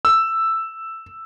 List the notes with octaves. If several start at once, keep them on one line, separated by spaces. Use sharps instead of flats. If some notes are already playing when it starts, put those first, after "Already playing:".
E6